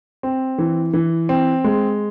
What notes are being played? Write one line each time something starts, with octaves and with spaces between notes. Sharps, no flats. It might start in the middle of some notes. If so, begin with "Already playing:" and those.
C4
E3
E3
C4
G#3